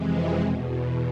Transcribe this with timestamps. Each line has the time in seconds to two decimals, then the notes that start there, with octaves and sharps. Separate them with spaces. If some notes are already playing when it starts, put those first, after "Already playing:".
Already playing: F2 C3 E3 G#3
0.40 E2 B2